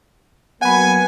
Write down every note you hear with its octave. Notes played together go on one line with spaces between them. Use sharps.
F#3 A#3 B3 F#5 G#5 B5